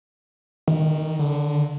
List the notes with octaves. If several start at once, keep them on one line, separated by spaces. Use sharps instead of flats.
D#3
D3